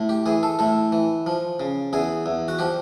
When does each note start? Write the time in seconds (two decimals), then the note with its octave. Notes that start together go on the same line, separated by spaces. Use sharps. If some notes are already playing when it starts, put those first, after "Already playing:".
Already playing: A2
0.09 G4
0.26 E3 G#4
0.43 A4
0.59 A2 A4
0.92 E3
1.26 F3
1.60 C#3
1.93 E2 G#4
2.26 E2
2.48 F#4
2.59 F3 G4